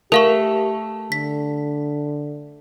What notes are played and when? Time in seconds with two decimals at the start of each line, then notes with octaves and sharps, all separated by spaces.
0.12 A3 G4 A#4 F5 C#6
1.12 D3 B6